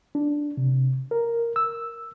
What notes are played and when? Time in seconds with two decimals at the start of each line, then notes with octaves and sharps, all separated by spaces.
0.15 D4
0.57 C3
1.11 A#4
1.56 E6